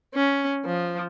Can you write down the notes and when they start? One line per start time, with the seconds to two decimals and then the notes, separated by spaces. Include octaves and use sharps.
0.14 C#4
0.65 F3